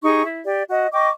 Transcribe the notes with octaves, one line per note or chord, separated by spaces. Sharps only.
D#4 G4 G#4 C#6
E4
G4 D5
F#4 D#5
D#5 G5 C#6 D6